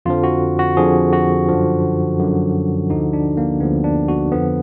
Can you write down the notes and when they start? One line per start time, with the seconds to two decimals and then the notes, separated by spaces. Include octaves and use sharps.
0.06 F2 D3 F3 F4
0.24 F#4
0.59 F#4
0.77 F2 D3 F3 G#4
1.13 F#4
1.48 F#2 D3 F3
2.19 F#2 D3 F3
2.90 D2 D3 F3 D#4
3.13 D4
3.37 A#3
3.60 D2 D3 F3 B3
3.84 D4
4.08 F#4
4.31 F2 D3 F3 B3